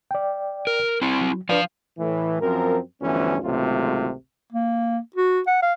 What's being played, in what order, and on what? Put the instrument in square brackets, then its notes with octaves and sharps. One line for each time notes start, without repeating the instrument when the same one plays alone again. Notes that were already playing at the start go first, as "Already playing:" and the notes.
[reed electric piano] D5 G5
[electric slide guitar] A#4
C4 E4
[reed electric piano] F#3
[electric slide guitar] F3 F5 [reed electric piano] D4 B4 D5
[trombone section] A2 E3
F#2 F3 C4 A#4
D2 G2 E3 F3 B3 C#4
G#1 C#2 C3 F#3 A3 F4
[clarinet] A#3
F#4
F#5
F5